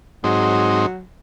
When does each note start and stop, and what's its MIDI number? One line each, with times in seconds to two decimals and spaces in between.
0.24 0.86 44
0.24 1.04 54
0.24 0.86 60
0.24 0.86 63